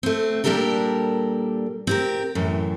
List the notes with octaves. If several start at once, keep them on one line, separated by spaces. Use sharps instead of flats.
A3 C4
A#2 G3 D4 G4 A4 A#4
C4 G4 A#4
F#2 A2 E3